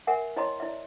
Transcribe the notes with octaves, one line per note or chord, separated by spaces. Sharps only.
A#4 E5 F#5 G#5
E4 C#5 D#5 A5 A#5 C6
E4 D5 E5